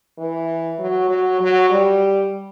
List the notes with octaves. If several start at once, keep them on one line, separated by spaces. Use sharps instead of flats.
E3
F#3
F#3
F#3
G3